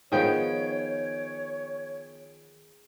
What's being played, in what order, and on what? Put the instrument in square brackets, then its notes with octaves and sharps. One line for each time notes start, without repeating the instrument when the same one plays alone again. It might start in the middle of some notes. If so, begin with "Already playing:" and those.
[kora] D#3 F3 B3 [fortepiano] G#4 G5 [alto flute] C#5